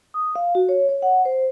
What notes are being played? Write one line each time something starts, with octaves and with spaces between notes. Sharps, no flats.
D#6
F5
F#4
C#5
C#5
F#5
C5